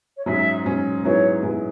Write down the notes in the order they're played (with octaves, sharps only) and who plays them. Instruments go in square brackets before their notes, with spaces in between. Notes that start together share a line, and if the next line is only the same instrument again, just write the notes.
[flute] C#5
[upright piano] G#2 F#3 C#4 [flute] E5
[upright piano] G#2 F#3 C#4
[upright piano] G#2 F#3 B3 E4 G#4 [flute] C#5
[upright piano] G#2 F#3 B3 E4 G#4